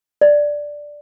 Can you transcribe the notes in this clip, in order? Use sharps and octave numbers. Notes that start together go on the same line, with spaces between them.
D5